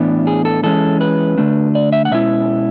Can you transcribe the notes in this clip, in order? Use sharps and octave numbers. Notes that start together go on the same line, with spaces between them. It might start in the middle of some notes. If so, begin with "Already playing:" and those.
Already playing: A2 E3 B3 D4
G#4
A4
E3 G#3 C#4 A4
B4
D3 A3 D4
D5
E5
F#5
B2 G#3 C#4 E4 E5